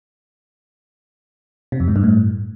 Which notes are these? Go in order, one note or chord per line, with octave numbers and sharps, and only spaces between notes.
C3
F2
G#2
G2
A2